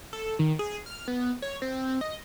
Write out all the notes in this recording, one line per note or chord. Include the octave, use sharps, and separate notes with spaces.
A4
D#3
G#4
F6
B3
C#5
C4
D#5